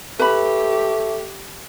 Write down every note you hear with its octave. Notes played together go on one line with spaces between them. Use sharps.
A3 G4 B4 B5